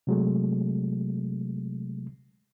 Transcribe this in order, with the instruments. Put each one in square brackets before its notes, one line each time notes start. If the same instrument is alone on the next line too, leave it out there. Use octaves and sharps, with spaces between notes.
[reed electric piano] C3 F#3 G#3 A3